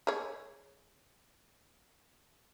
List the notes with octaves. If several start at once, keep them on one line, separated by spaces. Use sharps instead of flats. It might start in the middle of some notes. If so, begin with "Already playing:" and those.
G#4 C#5